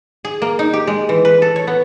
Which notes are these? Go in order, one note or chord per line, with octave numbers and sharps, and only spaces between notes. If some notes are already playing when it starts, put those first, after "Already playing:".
G#4
A#3
D#4
G4
G#3
E3
B4
A4
C#5
B3